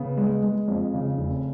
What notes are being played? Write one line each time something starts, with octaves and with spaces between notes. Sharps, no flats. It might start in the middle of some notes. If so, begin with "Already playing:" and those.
Already playing: C#3 B3
G#3
G#3
F2
C#3
F1